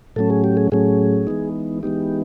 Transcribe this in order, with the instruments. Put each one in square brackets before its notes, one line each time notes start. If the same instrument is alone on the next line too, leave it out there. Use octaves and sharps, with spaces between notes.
[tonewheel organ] A2 F#3 A3 C#4 A4
G#4
G4
G#4
A2 F#3 A3 C#4 G#4
E3 G#3 B3 D#4
E3 G#3 B3 D#4 G4